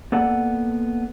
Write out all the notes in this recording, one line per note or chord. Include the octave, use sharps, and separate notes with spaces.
A#3 B3 A4 D5 F#5